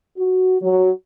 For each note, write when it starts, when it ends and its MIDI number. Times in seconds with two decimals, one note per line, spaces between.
0.18 0.56 66
0.62 0.90 54